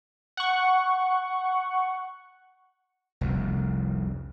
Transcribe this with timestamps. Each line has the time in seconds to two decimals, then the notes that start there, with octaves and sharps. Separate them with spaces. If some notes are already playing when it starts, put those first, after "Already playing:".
0.37 F#5 C#6
3.21 F1 C2 F2